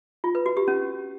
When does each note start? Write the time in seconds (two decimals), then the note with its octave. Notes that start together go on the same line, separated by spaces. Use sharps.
0.24 F4
0.35 B4
0.46 F#4
0.57 G4
0.68 C#4